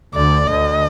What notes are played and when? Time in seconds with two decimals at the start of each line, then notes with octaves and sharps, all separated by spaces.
0.15 D2 D3 D5
0.47 D2 D3 D#5